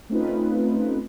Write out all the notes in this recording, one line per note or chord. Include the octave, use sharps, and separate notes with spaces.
A3 C4 C#4 D#4 F4 B4